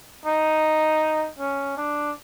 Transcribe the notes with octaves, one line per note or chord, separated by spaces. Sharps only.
D#4
C#4
D4